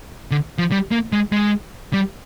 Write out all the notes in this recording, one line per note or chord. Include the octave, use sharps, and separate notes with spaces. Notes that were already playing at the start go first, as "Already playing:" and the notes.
D3
F3
G3
A#3
G#3
G#3
G3